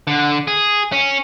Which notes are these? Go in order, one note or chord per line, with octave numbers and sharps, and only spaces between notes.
D3
G#4
C#4